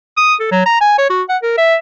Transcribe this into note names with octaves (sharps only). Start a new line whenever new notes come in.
D#6
A4
F#3
A#5
G#5
C#5
F#4
F#5
A#4
E5